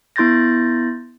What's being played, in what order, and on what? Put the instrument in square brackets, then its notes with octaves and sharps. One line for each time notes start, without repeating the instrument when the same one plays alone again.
[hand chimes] B3 E4 C6 G6 A6 A#6